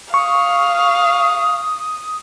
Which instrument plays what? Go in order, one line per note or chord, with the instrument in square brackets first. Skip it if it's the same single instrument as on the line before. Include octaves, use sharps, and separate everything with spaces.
[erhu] F5 [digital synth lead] C#6 [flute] D#6